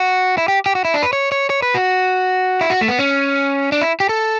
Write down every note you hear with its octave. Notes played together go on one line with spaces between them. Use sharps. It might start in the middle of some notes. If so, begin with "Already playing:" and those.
Already playing: F#4
E4
G4
G4
F#4
E4
D4
B4
C#5
C#5
C#5
B4
F#4
E4
F#4
A3
B3
C#4
D4
E4
G4
A4